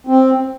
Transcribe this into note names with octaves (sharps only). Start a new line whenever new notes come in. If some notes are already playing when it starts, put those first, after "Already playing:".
C4